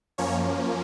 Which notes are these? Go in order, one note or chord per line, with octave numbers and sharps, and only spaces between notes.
F#2 F3 A#3 C#4 C#5